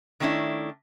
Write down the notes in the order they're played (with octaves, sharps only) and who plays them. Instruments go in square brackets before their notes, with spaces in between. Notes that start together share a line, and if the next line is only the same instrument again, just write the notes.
[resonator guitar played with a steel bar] D#3 A3 C#4 D4 E4